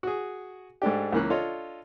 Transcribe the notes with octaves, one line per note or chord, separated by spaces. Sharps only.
F#4 G#4
G#2 A3 D4 G4
C#2 E3 A#3 C#4 F#6
D4 F4 A4 C#5 D#5